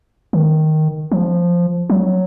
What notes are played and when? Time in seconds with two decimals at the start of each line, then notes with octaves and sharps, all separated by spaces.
0.33 D#3
1.11 F3
1.90 F#3